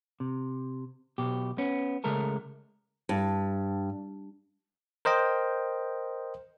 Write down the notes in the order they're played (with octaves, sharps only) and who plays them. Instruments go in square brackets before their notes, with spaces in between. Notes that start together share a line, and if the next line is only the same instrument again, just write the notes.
[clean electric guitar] C3
B1 B2 G4
B3 C#4
C#3 G#3 A3 A#4 A5
[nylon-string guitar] G2
[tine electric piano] A#4 C5 D#5 G5